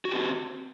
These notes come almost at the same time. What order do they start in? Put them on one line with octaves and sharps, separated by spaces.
F#4 G4 C4